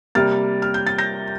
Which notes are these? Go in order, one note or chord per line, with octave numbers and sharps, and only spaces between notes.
C3 G3 A#3 F6 A6
F6
G6
A6
G6 A#6